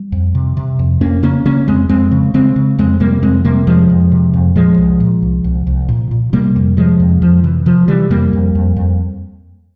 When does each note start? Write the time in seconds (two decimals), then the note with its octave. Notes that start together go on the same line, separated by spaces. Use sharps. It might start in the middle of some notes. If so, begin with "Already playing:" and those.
Already playing: G3
0.12 F2
0.35 C3
0.57 C3
0.79 F2
1.01 F2 A#3 C#4
1.23 C#3 A#3 C#4
1.45 C#3 A#3 C#4
1.68 F2 G#3 C4
1.89 F2 G#3 C4
2.12 C#3
2.34 C#3 G#3 C4
2.56 C#3
2.79 F2 G#3 C4
3.00 C3 G3 A#3
3.22 F2 G#3 C4
3.45 C3 G3 A#3
3.67 F2 F3 G#3
3.90 F2
4.12 C3
4.34 F2
4.55 A#2 F3 G#3
4.78 C2
5.00 A#2
5.22 C2
5.44 C2
5.67 C2
5.89 A#2
6.11 A#2
6.33 C3 G3 A#3
6.56 F2
6.77 C3 F3 G#3
7.00 F2
7.22 F2 F3
7.44 C3 E3
7.66 C3 F3
7.88 C3 E3 G3
8.10 F2 G3 A#3
8.33 F2
8.55 F2
8.77 F2